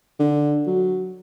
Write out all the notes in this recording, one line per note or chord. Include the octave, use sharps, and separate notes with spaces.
D3
F#3